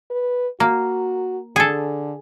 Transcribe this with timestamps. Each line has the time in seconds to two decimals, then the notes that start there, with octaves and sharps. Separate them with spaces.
0.10 B4
0.60 A#3 F#4
1.56 D3 G#4 A4